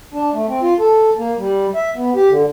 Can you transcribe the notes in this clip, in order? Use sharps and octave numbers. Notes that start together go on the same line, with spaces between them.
D4
A3
C4
F4
A4
A#3
G3
E5
B3
G4
D3